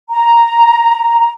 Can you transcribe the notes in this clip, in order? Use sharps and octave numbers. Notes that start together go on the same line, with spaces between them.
A#5